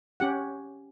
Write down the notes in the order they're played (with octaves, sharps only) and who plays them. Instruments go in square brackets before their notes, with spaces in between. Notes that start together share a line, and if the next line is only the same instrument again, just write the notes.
[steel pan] C#4 G4 F#5